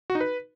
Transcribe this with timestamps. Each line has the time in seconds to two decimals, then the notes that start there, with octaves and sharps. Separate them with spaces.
0.10 F#4
0.15 D#4
0.21 B4